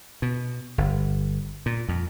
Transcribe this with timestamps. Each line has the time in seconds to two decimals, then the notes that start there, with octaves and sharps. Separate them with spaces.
0.22 B2
0.78 G1
1.66 A#2
1.89 F2